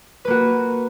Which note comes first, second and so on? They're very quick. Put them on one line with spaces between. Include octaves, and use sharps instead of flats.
B4 A#3 F#4